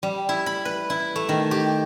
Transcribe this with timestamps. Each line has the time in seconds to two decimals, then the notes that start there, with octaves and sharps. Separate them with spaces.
0.03 G3
0.29 E4
0.46 B5
0.65 B4
0.90 E4
1.16 A3
1.29 D#3
1.51 G4